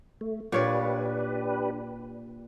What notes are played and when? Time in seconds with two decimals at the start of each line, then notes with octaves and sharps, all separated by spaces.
0.21 A3
0.52 A#2 D4 G4 B4 C#5 D5